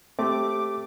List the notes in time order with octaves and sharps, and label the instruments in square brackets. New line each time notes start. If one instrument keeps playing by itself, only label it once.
[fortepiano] A3 [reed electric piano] C4 G4 [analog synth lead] D6